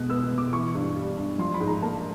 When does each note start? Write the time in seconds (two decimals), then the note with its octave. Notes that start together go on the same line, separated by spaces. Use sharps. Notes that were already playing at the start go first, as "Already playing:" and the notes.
Already playing: B2 G#3 F#6
0.10 B3 E6
0.24 E6
0.31 B2
0.38 D6
0.53 E3 C#6
0.75 G2
0.96 G3
1.17 G2
1.39 F3 C6
1.54 B5
1.60 G#2
1.68 A#5
1.82 A#3 A5